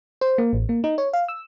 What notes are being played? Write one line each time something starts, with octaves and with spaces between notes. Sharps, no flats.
C5
A#3
A1
A#3
D#4
C#5
F5
E6